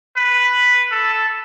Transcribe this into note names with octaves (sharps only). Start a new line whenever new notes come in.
B4
A4